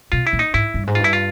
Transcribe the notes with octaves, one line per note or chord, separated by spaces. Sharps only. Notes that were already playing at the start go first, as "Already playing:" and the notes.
B2 F4
E4
A#2
D#4
G#2 E4
G2
G#2
F4
G2 E4
F4